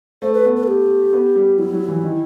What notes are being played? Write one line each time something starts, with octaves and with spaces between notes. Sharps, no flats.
A3 C5
B4
B3
B4
A4
G4
B3
G3
F#3 E4
F#3
E3
D#3